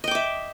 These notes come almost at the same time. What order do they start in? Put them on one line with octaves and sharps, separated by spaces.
D#5 G5 D6 E5